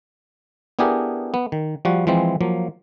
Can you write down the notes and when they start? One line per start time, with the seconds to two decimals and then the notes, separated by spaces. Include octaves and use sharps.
0.79 B3 D4 E4 G4 G#4 A#4
1.34 B3
1.52 D#3
1.85 F3 G3 F#4
2.07 E3 F3 G#3 C4
2.41 F3 F#3 A#3